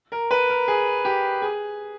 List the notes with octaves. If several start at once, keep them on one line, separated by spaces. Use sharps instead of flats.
A#4
B4
A#4
G#4
G4
G#4